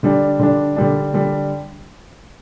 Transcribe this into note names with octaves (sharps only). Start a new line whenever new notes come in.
D3 G3 D4
D3 G3 D4
D3 G3 D4
D3 G3 D4